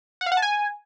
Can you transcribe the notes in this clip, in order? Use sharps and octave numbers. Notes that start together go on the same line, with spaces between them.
F#5
F5
F#5
A5
G#5